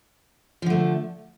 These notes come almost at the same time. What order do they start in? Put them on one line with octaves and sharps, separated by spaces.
F3 D3 A3